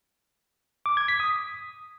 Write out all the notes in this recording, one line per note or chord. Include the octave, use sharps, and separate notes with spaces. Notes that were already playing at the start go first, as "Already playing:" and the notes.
D6
G#6
B6
D#6